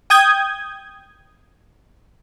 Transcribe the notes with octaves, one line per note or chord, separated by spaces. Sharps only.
G5 D#6 G6 G#6